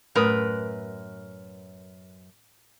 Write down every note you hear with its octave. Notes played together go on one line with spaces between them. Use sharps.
F#2 A2 A3 A#4 B4 D#6